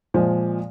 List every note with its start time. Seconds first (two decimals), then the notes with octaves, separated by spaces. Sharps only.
0.14 A#2 F3 G#3